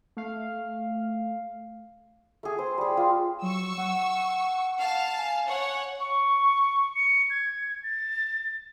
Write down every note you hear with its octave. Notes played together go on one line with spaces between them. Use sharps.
A3 F5
A3 G#4
C5
G3 G#4
F4
F#3 C#6 E6
F#5
F5 A5
G#5
C#5 F#5
C#6
C#7
G#6
A6